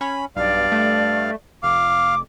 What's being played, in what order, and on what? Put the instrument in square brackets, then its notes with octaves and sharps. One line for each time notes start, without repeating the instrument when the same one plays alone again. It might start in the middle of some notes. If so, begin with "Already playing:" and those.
[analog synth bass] C#4 [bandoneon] B5
[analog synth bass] B1 [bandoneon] G2 F5 [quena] D5
[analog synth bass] A3
[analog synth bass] F1 [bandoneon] F5 [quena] D6